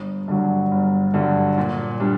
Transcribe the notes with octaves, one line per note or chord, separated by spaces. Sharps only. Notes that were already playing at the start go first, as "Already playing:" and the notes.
Already playing: G1
G2 D3 F#3
G1
G2 D3 F#3
A#2
G3 D4